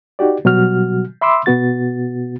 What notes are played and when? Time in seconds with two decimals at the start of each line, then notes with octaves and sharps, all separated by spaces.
0.19 D#4 F#4 G4 D5
0.45 B2 F#3 G3 F#4 F6
1.21 E5 B5 C6 D6 E6
1.46 B2 B3 F#4 A6